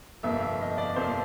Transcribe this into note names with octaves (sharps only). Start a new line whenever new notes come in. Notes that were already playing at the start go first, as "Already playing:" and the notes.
G1 F2 C3 F3 A#3 E5
E5
D#5
D5
G1 F2 C3 F3 A#3 C5